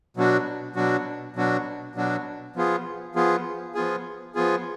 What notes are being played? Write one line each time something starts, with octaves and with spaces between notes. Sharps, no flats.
B2 F#3 D4 F#4
B2 F#3 D4 F#4
B2 F#3 D4 F#4
B2 F#3 D4 F#4
F3 B3 F4 G#4
F3 B3 F4 G#4
F3 B3 F4 G#4
F3 B3 F4 G#4